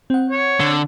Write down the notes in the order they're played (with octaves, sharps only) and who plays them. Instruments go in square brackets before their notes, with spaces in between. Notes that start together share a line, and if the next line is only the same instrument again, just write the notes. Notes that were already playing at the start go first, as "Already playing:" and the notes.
[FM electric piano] C4 F#5
[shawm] C#5
[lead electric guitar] D3